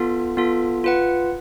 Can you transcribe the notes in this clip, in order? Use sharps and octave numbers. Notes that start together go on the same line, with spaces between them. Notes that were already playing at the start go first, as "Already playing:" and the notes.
Already playing: B3 F4 A4
B3 F4 A4
F4 B4 F#5